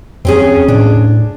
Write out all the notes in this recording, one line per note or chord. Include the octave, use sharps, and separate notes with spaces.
E2 C4 C#4 G#4
A2 D4